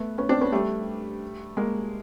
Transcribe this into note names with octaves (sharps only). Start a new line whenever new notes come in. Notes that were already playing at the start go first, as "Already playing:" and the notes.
Already playing: A3 B3
B3 C#4
C4 D4
B3 C#4
G3 A3
G#3 A#3